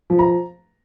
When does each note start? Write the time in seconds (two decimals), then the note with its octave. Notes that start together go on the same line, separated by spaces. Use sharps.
0.10 F3
0.19 A#5